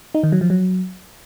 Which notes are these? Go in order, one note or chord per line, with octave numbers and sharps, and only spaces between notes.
D#4
D#3
F#3
F3
F#3